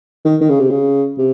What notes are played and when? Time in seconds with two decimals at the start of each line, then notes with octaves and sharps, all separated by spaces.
0.25 D#3
0.41 D#3
0.50 C#3
0.60 C3
0.70 C#3
1.18 C3